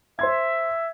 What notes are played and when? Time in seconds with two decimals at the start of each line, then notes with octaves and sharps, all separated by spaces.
0.19 C5 E5 C6 G#6